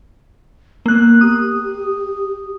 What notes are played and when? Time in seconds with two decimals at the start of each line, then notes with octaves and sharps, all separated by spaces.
0.86 A#3 B3 F#6
1.21 G4 D#6